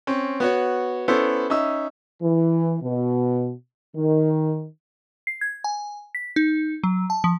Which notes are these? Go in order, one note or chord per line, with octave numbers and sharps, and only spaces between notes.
C4 C#4
B3 F#4 C#5
B3 C#4 E4 A4 C5
C#4 D#4 E5 E6
E3
B2
D#3
C7
G#6
G#5
B6
D#4
F#3
A5
F3